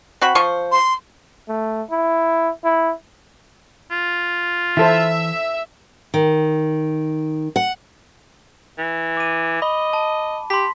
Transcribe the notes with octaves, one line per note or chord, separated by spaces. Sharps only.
C4 F#4 B5
F3 C5 C#6
C6
A3
E4
E4
F4
E3 E4 A4 C5 E5
D#3
F#5
E3
D6 D#7
D#5 B5 G7
A5
G4 C6 B6